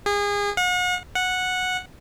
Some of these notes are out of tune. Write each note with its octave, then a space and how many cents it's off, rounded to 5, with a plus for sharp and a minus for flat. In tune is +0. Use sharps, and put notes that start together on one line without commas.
G#4 -30
F#5 -40
F#5 -10